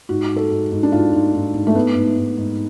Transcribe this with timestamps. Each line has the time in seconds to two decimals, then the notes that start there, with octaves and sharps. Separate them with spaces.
0.09 G#2 F#4
0.31 G#2
0.36 A4
0.51 G#2
0.72 G#2
0.83 D4
0.92 G#2 F4
1.13 G#2
1.34 G#2
1.54 G#2
1.67 A3
1.75 G#2 B3
1.95 G#2
2.17 G#2
2.37 G#2